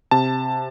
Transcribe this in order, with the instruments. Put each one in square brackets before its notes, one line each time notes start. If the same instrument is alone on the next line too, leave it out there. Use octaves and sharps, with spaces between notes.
[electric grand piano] C3 A5